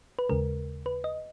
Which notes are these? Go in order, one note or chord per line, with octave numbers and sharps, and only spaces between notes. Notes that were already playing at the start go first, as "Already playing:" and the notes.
B4
D#2 C#3 G#3 A#4
B4
D#5